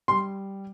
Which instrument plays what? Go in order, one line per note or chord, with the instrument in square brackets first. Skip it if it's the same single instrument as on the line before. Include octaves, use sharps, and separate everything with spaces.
[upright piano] G3 C6